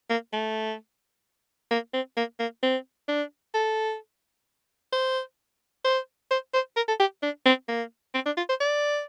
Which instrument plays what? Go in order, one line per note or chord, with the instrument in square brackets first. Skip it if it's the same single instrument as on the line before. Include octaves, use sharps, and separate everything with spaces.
[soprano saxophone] A#3
A3
A#3
C4
A#3
A#3
C4
D4
A4
C5
C5
C5
C5
A#4
A4
G4
D4
C4
A#3
C4
D4
F4
C5
D5